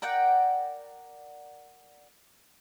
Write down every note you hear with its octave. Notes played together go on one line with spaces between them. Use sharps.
A#4 D5 F#5 G5